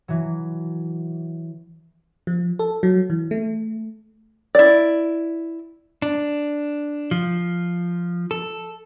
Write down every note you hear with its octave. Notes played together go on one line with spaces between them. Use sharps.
E3 F#3
F3
A4
F#3
E3
A3
E4 D5
D4
F3
A4